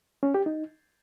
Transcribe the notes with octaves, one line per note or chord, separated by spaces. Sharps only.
C#4
G4
D#4